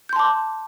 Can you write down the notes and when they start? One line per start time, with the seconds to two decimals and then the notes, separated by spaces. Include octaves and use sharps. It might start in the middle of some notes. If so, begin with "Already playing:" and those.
0.09 G6
0.13 C6
0.16 A5
0.19 D6